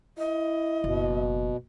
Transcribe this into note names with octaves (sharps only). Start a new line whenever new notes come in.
E4 D#5
F#1 B2